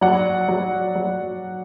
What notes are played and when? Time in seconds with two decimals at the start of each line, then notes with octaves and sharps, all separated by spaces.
0.01 F#3 D5 F#5
0.48 F#3
0.95 F#3